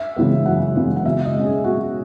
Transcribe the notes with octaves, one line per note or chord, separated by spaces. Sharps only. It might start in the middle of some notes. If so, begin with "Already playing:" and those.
Already playing: E5
C#3 E3 G#3 B3
F#2 F#5
C#3 E3 G#3 B3
F#5
B2 E5
D#5
G#3 C#4
G#4
B2 F#4